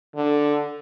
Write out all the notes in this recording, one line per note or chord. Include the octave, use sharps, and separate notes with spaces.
D3